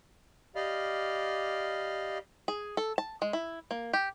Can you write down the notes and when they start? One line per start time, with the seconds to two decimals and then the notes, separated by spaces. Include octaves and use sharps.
0.56 G4 D5 D#5 F5 B5 F6
2.48 G#4
2.77 A4
2.98 A5
3.22 G#3
3.33 E4
3.71 A#3
3.93 G4